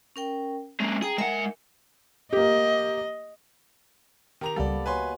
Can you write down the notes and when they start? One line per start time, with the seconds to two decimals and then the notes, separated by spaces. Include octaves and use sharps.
0.16 C#4 A#4 G5
0.80 G#3 A#3 C#4
1.02 G#4 G5 A#5
1.18 G#3 A#4 E5 F#5 G#5
2.33 A#3 G4 D#5
4.41 D#3 G4 A#5 F7
4.56 C#2 G3 A#3 B3 G4 A4 D5
4.86 F#3 B4 C#5 D#5 G#5 C6